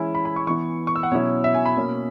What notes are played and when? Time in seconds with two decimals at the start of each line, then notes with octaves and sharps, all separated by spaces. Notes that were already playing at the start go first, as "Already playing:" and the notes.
Already playing: E3 G#3 C#4 E4 G#5
0.15 B5
0.25 B5
0.36 C#6
0.47 E3 B3 E4 C#6
0.87 C#6
0.96 E6
1.03 F#5
1.11 B2 F#3 C#4 E4 C#5
1.44 E5
1.54 G#5
1.65 B5
1.76 B2 A#3 C#4